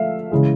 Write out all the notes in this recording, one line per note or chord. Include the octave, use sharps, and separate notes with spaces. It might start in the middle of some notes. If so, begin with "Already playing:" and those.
Already playing: F3 A3 E5 F5
C#3 E3 G#3